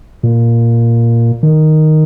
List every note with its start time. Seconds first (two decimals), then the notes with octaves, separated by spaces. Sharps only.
0.23 A#2
1.43 D#3